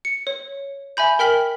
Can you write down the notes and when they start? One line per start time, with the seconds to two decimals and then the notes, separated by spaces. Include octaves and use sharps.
0.05 C#7
0.27 C#5
0.97 E5 G#5 B5 G6
1.19 A#4 G5 F6 B6 F#7 G7